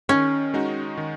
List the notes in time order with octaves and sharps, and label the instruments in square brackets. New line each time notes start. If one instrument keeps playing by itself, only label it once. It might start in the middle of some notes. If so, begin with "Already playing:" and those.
[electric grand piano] D#3 [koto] C#4
[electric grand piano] G#3 D#4 F#4
D#3